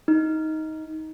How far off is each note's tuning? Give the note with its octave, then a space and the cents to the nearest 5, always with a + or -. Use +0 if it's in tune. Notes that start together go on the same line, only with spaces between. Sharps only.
D#4 +15